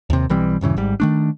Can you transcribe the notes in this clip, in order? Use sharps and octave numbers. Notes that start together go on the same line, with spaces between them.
D#2 C3
B1 E3 G3 C4
D#1 G2 C#3 E3
G#1 G#2 G3
D#3 A3 D4